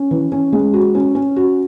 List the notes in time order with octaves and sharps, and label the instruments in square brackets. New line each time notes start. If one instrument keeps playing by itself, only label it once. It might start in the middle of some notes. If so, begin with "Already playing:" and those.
Already playing: [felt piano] C#4
E3
C#4
G#3
F#4
C#4
C#4
F#4